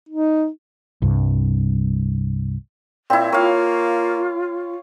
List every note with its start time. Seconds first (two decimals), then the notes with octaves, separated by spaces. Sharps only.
0.09 D#4
1.02 C2 G2
3.10 A#2 C4 E4
3.32 A#3 F4 C#5 F5